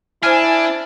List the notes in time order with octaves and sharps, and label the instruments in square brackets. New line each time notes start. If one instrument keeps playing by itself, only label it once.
[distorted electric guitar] D4 [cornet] E4 [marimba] C5 F6 [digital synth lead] G#5